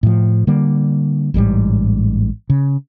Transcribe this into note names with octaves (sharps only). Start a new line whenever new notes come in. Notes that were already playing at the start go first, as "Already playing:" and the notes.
A2 F3
D3 G3 A#3
A1 G#2 C3 G3
C#3